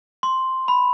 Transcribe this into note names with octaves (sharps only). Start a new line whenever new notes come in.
C6
B5